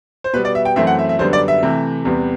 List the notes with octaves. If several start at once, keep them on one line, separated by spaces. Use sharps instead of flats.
C5
B2 G3 B3 B4
D5
E5
G5
F#2 E3 A3 C4 E5
F#5
E5
E5
F#2 D3 G3 B3 C5
D5
E5
C3 E3 A3
E2 C3 G3 B3